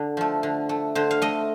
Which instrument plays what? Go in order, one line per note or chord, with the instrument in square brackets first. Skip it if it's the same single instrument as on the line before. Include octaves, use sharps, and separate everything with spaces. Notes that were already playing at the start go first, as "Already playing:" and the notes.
Already playing: [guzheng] D3 D5
F3 A3
D3
A3
D3 C5
F5
A3 D#5